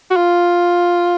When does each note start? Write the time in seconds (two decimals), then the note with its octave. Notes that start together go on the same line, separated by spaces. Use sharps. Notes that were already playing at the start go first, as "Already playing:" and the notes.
0.11 F#4
0.16 F4